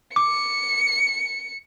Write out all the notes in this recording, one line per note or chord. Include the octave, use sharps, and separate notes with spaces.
D6 C#7